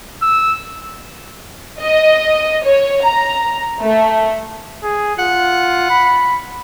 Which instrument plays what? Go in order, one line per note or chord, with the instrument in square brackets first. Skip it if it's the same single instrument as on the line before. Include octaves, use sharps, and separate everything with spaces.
[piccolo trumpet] E6
[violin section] D#5
C#5
A#5
A3
[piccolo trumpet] G#4
[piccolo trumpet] F4 [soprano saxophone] F#5
[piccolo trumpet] B5